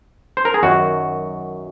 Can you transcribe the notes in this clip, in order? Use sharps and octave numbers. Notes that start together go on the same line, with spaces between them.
C5
A#4
G#4
F#2 D#3 F#4